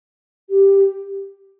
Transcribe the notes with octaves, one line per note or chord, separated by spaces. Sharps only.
G4